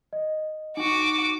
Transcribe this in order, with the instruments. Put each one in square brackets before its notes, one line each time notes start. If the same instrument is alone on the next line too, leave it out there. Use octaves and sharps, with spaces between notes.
[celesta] D#5
[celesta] D#4 [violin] F#4 D6